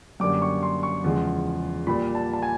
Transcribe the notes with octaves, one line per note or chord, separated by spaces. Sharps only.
F#2 D3 G3 A#3 D6
C#6
C6
C#6
E2 C#3 F3 G#3
A#2 G3 A#3 B5
A5
A5
G#5